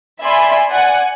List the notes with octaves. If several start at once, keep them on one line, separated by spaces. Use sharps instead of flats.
D5 E5 G#5 B5 C6
D5 F#5 G#5